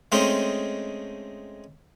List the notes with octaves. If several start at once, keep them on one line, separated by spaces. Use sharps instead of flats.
G#3 A3 C4 C#4 D#4